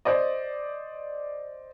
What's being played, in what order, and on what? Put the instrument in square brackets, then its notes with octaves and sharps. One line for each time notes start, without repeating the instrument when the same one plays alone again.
[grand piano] C5 D5 D#5